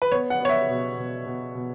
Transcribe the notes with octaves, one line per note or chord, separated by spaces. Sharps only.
B4
B3 C#5
F#5
B3
C#5
E5
B2
B2
B2
B2